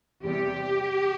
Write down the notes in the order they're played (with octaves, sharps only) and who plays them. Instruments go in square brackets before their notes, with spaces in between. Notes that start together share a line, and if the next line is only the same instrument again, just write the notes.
[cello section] E2 C3 G3 G4